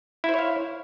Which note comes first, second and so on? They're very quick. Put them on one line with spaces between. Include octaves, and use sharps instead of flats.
E4 C5 C#5 F5